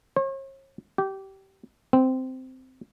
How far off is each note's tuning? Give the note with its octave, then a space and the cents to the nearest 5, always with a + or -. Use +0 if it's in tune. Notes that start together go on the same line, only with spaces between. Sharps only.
C#5 -45
G4 -20
C4 -10